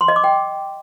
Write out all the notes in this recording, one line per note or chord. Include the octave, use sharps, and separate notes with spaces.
C6
D#5
D6
G5